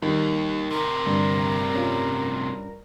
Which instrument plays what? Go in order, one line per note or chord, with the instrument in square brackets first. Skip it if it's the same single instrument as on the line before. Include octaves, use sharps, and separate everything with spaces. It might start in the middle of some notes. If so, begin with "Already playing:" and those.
[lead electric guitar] D#2 [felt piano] D#3 [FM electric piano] G3
[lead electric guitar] A2 C3 [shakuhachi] A#4
[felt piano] G2 [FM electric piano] D3
[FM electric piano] C#4 F4